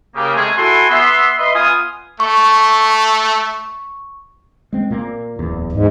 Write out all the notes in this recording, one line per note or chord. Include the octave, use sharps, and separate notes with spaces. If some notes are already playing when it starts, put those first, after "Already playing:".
C#3 A#3 G4
C3 G#3 A3 G#4
E4 F#4 A4 G#5 C6
B3 E5 C6
B4 D#5 E5 C6
B3 F4 G#5 D#6
A3 C#6
G#3 C4
A#2 A#3
D1 E2
G#2